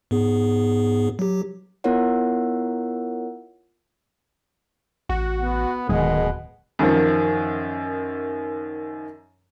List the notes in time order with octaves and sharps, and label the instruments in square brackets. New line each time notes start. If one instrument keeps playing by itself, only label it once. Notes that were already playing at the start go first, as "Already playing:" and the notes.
[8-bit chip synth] G#2 B3 G#4
F#3 G4
[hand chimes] B3 E4 F4 A#4 C#5 F#5
[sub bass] A1 [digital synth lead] F#4
[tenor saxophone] B3
[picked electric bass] D1 [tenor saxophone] B2 [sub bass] D#3 [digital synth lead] G#3
[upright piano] F#2 D#3 F3